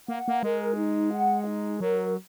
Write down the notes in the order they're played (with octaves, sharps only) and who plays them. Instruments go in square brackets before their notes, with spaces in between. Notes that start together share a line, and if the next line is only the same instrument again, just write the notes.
[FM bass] A#3 [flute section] F#5
[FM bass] A#3
[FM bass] G#3 [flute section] A#4
[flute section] D#4
F#5
D#4
[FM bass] F#3 [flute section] A#4